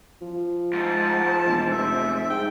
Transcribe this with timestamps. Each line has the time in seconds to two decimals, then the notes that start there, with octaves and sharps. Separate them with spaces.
0.22 F3
0.73 G#2 A5
1.47 E1
1.71 F1 E5
2.30 G#2 G5